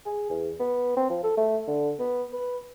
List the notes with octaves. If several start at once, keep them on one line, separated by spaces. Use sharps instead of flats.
G#4
E2
B3
C4
F3
A4
A3
D3
B3
B4